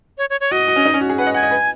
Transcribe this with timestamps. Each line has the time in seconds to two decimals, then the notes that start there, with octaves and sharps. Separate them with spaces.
0.18 C#5
0.30 C#5
0.41 C#5
0.51 F#4 D#5
0.68 F#4
0.76 C#4
0.85 D#4
0.94 C#4
1.01 F#4
1.09 G#4
1.18 B4 F#5
1.27 D#5
1.34 F#5 G#5
1.43 D#5
1.51 B4